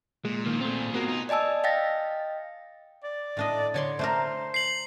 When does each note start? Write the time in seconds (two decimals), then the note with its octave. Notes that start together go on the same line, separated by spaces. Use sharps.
0.25 A#2 G#3
0.46 D#3 F3 A#3
0.61 A3 C4 F4 G#4
0.94 A#3 B3 F#4 A#4
1.08 D#4
1.29 D5 D#5 G#5 A5 E6
1.64 D#5 F5 G5 A6 A#6
3.04 D5
3.37 A2 D4 D#5
3.74 D3 C#5 D5 C6
3.99 A3 D4 A#4 C5
4.54 C7 F#7